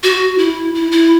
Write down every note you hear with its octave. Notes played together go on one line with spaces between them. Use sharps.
F#4
E4
E4
E4